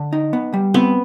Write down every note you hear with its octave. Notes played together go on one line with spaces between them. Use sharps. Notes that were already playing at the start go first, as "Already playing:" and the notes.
Already playing: D3
D#4
B3
G3
B3 C4